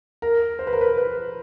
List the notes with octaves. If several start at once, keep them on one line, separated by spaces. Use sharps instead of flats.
A#4
C5
B4
A#4
B4
B4